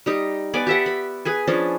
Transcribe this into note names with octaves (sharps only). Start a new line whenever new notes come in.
G3 D#4
B3 D5 G#5
G4 E5 F#5
B5
G#4 B4 G#5
F3 C#4 D4